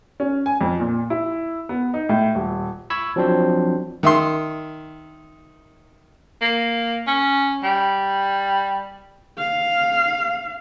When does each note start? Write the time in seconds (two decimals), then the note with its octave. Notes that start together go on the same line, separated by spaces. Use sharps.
0.20 C#4
0.46 G#5
0.61 F2
0.80 A#2
1.10 E4
1.69 B3
1.94 D#4
2.09 A2
2.35 D#1
2.90 B5 C#6 E6 G#6
3.16 F3 F#3 C4 D4 C5
4.03 D#3 E5 C6
6.41 A#3
7.07 C#4
7.64 G3
9.38 F5